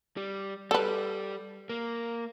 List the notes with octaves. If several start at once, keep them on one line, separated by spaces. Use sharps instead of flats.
G3
G3 A4 B4
A#3